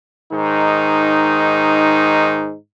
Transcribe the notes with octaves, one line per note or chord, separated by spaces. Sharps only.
G#2 D#3 D#4